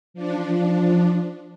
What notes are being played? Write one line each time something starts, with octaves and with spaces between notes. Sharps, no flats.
F3 D4